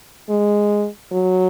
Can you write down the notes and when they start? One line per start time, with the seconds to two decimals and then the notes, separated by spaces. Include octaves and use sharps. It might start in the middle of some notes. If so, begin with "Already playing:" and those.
0.30 G#3
1.12 F#3